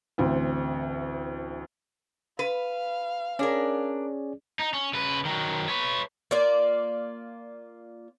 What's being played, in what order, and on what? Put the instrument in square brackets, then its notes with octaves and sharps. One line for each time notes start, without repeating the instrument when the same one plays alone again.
[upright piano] A1 D2 C4
[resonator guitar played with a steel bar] B4 [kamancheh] F5
[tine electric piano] C#4 G#4 D5 [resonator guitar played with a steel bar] D4 A#4
[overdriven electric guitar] D#4
C#4
C#3 B4
D#3 F#3
B4 C#5
[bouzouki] A#3 F4 D5